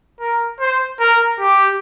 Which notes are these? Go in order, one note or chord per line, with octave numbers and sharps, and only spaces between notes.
A#4
C5
A#4
G4